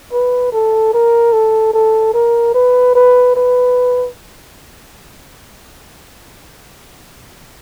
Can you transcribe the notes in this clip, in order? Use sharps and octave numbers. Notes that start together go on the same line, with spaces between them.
B4
A4
A#4
A4
A4
A#4
B4
B4
B4